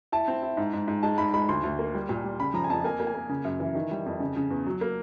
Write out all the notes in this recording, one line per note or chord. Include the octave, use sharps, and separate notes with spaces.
E4 A5
C4
E4
G#2
G#2
G#2
G#3 A5
G#2 B5
G#3 B5
D2 C6
D2
A#3
G3
A#2
G3
C#3 B5
F3 A#5
G#5
F2 A5
A#3 G#5
A#3
G#5
A#3
C#3
F#2
E3
D#3
G3
F2
C#3
C#3
E2
F#3
A#3